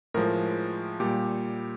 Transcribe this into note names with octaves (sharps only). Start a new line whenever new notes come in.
A2 F3 G#3 A#4
A#2 G3 G4